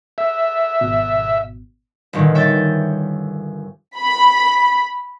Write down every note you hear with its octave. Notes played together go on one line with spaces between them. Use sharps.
E5
G#1 B2
G1 G2 A#2 D#3
C#5 E5 G5 G6 A6
B5